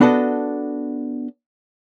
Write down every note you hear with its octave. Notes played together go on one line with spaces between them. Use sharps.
B3 D4 F#4 A4 D#5